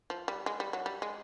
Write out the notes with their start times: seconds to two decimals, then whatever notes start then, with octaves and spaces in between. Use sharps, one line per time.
0.10 F3
0.28 G3
0.46 G#3
0.60 G3
0.73 F#3
0.86 G3
1.02 G#3